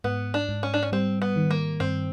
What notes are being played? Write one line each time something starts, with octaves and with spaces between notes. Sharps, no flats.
G#2 B3
D4
G#2
C#4
D4
C#4
G3 C4
B3
D#3
A#3
G2 C4